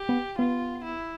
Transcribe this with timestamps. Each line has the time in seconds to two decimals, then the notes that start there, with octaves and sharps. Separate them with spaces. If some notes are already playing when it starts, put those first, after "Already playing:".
Already playing: G4
0.09 B3
0.38 B3 F4
0.84 E4